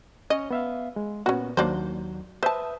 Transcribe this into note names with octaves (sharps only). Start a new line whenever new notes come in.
C#4 C#5 D#5
B3 E5 F5
G#3
A#2 B3 C#4 F#4
D#2 F#3 A#3 D4 C5
B4 C5 E5 A5 D#6